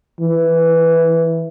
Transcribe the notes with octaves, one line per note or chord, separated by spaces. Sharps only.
E3